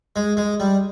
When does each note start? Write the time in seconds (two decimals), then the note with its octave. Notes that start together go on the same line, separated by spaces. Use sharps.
0.16 G#3
0.37 G#3
0.60 G3